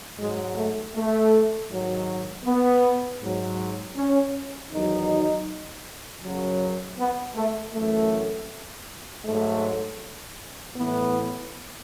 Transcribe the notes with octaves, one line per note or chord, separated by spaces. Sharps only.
G#2 F#3 G#3
A3
A3
G#2 D#3 F#3
B3
G#2 F#3
C#4
E2 D#3 F#3 D#4
F#2 C#3 F#3
B3
A3
F#2 E3 A3
G#2 F#3 A3
A2 E3 B3